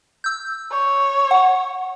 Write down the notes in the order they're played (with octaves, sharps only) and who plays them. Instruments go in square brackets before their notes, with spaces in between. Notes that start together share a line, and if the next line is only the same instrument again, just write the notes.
[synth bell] E6 G6
[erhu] C#5
[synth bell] F#5